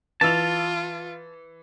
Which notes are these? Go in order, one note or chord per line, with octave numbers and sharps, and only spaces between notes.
E3 F4 A5 E6 F7